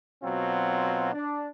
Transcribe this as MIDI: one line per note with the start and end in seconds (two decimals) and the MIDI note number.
0.23 1.12 47
0.23 1.12 54
0.23 1.12 60
0.23 1.12 65
1.13 1.48 62